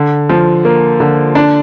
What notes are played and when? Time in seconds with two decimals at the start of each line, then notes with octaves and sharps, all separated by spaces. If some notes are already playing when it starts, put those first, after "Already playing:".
Already playing: D3
0.29 F3
0.65 A#3
1.00 D3
1.35 D4